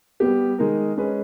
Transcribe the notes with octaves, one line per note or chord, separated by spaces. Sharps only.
G3 B3 G4
D#3 G#3 D#4 A#4
G#3 C#4 G#4 B4 D#5